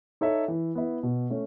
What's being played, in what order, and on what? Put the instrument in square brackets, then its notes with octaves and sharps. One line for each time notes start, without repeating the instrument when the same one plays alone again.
[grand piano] D#4 A4 C#5 E5
E3
B3 E4
B2
A3 C#4